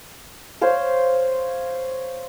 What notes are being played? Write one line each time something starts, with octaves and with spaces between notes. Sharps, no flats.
C5 C#5 F5